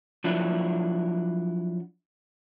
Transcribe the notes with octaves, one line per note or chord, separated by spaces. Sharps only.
F3 F#3 D4 E4